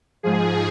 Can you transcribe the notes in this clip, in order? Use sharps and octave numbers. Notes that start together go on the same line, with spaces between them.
G#2 F3 G#4